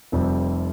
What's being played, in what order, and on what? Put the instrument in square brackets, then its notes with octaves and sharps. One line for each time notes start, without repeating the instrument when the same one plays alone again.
[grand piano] F1 F2 C3 G3 C4